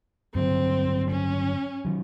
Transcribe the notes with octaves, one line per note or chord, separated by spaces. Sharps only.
G2 D3 F#3 C4
C#4
D#3 F#3